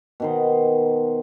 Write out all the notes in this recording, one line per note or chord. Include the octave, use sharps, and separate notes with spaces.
B2 D#3 C5